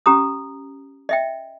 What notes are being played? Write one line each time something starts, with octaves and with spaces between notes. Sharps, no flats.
C#4 G4 A#5 D#6
D#5 E5 G5